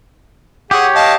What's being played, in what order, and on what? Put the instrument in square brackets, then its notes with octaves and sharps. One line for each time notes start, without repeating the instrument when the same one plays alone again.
[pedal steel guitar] G4 C#5 [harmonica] G#4 F#5
[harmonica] D#5 F5 A5